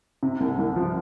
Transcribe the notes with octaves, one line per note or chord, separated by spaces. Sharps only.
C3
C2
C2
F3